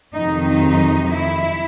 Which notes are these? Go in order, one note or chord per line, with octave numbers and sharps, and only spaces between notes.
F2 C3 D#3 F#3 D#4
D#4
E4